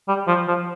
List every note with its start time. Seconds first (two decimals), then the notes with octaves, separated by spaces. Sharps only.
0.08 G3
0.27 F3
0.48 F3